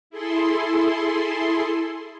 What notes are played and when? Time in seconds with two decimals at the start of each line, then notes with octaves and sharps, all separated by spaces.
0.10 E4 G#4 A4 C6